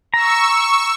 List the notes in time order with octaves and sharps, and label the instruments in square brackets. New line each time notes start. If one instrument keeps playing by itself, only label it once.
[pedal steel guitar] A#5 [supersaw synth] C#6 E6